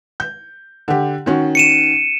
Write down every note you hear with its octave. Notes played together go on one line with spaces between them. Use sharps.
G6
D3 G4
D#3 C#4 F#4
C#7 D#7 E7